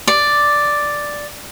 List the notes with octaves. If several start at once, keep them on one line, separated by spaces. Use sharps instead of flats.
D5